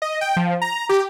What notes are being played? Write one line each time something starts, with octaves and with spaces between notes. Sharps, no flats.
D#5
G5
F3
A#5
G4